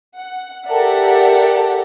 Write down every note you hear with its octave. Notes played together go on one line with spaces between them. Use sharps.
F#5
G4 A4 A#4 D5 E5 F#5